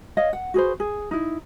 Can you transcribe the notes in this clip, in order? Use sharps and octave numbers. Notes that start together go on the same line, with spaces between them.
C#5 D#5 F5
F#5
F#4 G#4 B4 C5
G#4
D#4 E4